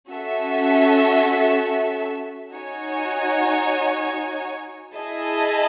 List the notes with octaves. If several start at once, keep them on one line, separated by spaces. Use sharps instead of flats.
C#4 F#4 A4 E5
D#4 F#4 C#5 G#5
E4 G#4 D#5 A5